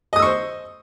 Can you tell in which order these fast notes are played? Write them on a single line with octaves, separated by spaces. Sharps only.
D#5 D#6 E6 C#6 C5